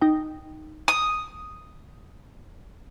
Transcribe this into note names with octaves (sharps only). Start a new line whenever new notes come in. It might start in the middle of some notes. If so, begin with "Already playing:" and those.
D#4 G5
D#6